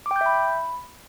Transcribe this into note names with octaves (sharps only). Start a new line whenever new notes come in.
D6
G5
G6
E5
B5